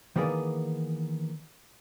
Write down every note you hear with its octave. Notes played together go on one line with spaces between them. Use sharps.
D#3 E3 A#3 B3 G#4 D5